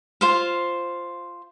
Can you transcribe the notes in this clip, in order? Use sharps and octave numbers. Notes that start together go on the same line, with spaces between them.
F4 C5 F5